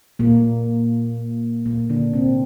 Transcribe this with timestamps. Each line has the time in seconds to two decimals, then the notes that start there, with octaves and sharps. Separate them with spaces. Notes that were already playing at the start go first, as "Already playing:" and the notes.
0.19 A#2 A#3
1.66 A#2 A#3
1.89 D3 D4
2.14 C3 C4